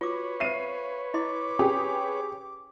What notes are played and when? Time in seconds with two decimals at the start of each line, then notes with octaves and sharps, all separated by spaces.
0.01 F4 F#4 B4 C#5 D6
0.40 C5 E5 F5 C7 D#7
1.14 E4 D#5 C6 D6
1.59 C#4 G4 G#4 G5